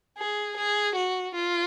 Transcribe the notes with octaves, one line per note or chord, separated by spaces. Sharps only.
G#4
G#4
F#4
F4